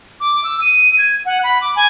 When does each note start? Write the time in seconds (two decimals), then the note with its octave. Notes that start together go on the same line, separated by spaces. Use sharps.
0.20 D6
0.44 E6
0.61 D#7
0.98 G#6
1.25 F#5
1.43 B5
1.61 D6
1.76 G#5